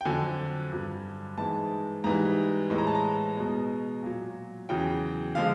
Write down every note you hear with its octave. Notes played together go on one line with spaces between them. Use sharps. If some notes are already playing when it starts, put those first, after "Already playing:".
G5
F2 D3 F#3 G#5
G2 D3 F#3
G#2 E3 G#3 A5
G#2 E3 G3 A#5
A2 E3 G#3
A#5
A5
A#5
B2 G#3
A#2 F#3
E2 C#3 F#3 G5
D3 F3 G#3 F5